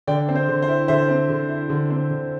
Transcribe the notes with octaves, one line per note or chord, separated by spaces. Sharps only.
D3 D5 G5
C4
C5
D3
C5
E4
D3 C5 E5
C4
D3
E4
D3
C4
D3